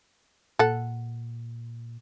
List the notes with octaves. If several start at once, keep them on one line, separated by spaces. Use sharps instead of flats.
A#2 A4 F#5